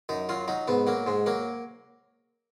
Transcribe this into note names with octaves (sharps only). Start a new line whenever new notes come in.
F#2 D#4
F#3 F4
F#3 D#4
G#2 B3
F#3 A#3
G#2 G#3
F#3 A#3